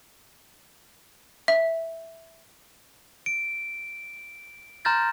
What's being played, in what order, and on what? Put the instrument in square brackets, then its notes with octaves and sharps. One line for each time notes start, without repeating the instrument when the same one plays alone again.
[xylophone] E5
[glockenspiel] D7
A#5 C6 F6 G6 A6 A#6